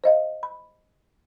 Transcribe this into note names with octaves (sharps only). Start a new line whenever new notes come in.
C5 D#5 F5
B5